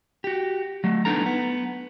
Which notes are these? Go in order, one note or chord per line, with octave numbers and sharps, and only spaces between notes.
F#4 G4
F#3 A3
B3 D4 D#4 A4 A#5
B3